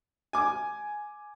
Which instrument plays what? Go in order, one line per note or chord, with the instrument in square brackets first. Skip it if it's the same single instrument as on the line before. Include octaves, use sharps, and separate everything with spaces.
[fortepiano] G#5 D6